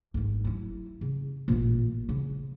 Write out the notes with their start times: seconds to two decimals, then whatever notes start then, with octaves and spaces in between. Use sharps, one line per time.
0.14 G#1 G2
0.44 F#3 E4
1.01 C#3
1.48 A1 A#2
2.09 C#3